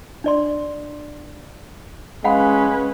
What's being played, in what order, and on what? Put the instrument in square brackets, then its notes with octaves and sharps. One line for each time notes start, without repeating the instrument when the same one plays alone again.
[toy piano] D4 D5 C6
[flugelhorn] G#3 [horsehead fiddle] C#4 B4 [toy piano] F5 F#5 B5